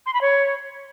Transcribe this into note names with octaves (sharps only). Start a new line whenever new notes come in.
C6
B5
C#5